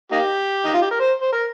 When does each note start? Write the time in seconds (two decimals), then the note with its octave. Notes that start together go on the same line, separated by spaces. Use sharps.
0.12 A#3 D#4 G4
0.65 D#4
0.74 F4
0.82 G4
0.91 A#4
1.00 C5
1.21 C5
1.32 A#4